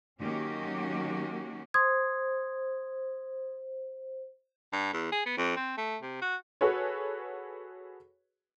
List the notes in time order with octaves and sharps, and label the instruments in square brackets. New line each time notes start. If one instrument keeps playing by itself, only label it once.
[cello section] D#3 F#3 A#3 C#4 F#4 G4
[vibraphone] C5 [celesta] C6 D#6 G#6
[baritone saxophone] G2
E2
G#4
B3
F2
C4
A3
C3
F#4
[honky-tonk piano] F#4 G#4 A4 B4 C#5